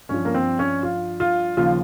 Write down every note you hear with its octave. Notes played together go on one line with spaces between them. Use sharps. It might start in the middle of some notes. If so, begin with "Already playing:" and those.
G2 F3 C#4
A#3
C4
C#4
F4
F4
D#2 C#3 F3 F4